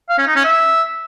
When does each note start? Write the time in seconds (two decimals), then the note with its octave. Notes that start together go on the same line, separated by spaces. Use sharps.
0.09 F5
0.18 C#4
0.27 D#4
0.36 C#4
0.45 E5